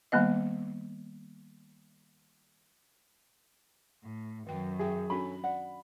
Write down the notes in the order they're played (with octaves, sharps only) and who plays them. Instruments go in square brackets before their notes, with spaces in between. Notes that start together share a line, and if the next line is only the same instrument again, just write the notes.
[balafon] D#3 G3 A#3 B3 D#5
[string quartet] A2
[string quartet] F#2 [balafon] D#3 G5
[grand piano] G#4 [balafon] E5 G5
[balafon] C#4 D4 F#4 [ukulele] A4 C#5 G#5 [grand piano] B5
[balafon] D5 [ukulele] F#5